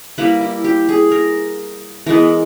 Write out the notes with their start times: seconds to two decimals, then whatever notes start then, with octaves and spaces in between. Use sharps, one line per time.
0.18 G3 A#3 E4 B4
0.41 E4
0.64 G4
0.89 G#4
1.12 A#4
2.06 E3 G#3 B3 A#4